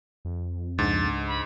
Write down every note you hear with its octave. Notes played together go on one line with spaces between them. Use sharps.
F2
C#2 G#2 D4 A6
B5